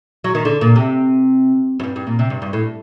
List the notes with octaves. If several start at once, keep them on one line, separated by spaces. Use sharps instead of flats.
F#3
D#3
D3
A#2
C3
F#2
G2
G2
A#2
C3
G2
G2
A2